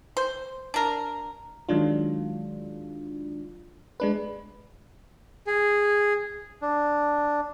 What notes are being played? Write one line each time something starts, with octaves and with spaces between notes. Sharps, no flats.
C5
D4 A#4
D#3 F#3 G#3 D4 F4
G#3 D4 B4
G#4
D4